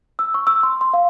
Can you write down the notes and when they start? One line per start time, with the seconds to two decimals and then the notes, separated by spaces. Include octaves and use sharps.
0.19 E6
0.34 C#6
0.47 E6
0.63 C6
0.81 C6
0.94 F5